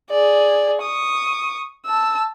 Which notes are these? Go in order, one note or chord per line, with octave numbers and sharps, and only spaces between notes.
G#4 D5
C#6 D#6
A5 E6